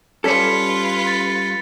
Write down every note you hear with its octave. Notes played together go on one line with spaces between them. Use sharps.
G3 C#4 F4 A4 B4 G#6 B6 C#7
A6